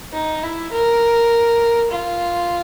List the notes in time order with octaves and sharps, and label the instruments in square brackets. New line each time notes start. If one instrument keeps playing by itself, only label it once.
[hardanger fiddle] D#4
E4
A#4
F4